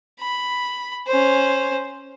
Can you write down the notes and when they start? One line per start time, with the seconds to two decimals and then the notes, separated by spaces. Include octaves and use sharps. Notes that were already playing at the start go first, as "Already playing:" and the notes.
0.20 B5
1.07 C#4 C5